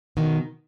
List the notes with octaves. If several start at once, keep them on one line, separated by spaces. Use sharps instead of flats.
B2 D#3